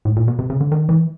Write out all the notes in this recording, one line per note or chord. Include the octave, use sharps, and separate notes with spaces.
A2
A#2
B2
C3
C#3
D3
D#3
E3